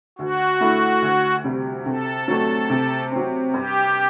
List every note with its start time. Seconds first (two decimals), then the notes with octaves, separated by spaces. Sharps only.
0.19 D2 F#4
0.60 D3 A3 E4
1.02 D2
1.44 C3 G3
1.86 C3 A4
2.28 F#3 A3 D4
2.70 C3
3.12 F#3 C4
3.53 G2 G4